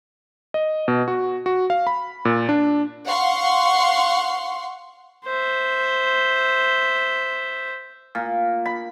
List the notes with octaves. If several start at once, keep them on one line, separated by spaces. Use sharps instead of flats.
D#5
B2
F#4
F#4
F5
B5
A#2
D4
F5 F#5 C6 C#6
C5 E5
A#2
B5